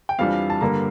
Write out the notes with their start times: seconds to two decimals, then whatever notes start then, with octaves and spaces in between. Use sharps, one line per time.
0.09 G5
0.19 F2 E3 G3 D4 F5
0.50 A5
0.61 G2 D3 G3 A#3 A#5